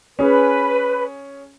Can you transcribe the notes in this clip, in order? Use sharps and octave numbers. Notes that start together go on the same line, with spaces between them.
C#4 G#4 B4